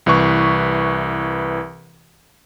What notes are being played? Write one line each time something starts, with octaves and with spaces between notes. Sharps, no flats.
C2 E3 B4 C#6